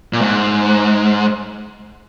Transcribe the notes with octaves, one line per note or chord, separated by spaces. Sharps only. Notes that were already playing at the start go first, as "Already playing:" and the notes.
A#2
G#2